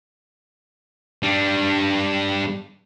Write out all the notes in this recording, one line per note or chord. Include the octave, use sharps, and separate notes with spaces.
G3 D4